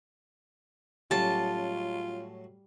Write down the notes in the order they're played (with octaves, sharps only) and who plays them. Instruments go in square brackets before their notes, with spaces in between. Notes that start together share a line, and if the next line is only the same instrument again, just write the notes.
[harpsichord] A2 F#3 C#4 [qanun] G3 [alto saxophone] F4 [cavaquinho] A5